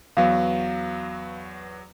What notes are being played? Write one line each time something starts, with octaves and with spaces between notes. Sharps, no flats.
E2 F#3 B3 F5